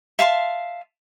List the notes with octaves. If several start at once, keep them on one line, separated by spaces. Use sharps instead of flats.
E5 F5 A5 C6